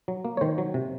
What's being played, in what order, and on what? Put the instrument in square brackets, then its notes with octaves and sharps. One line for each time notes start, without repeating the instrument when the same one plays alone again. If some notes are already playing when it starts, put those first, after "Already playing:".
[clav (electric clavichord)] F#3
A#3
C#5
D#3 C5
F#3
C3